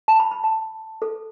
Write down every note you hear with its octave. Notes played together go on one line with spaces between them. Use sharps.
A5
B5
B5
A5
A4